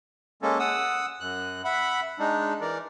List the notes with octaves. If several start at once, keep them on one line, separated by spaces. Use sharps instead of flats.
G#3 A#3 C#4 A4
F#5 D#6 E6
F#2 F#6
E5 F#5 B5
G#3 D4 D#4
E3 A#4 D5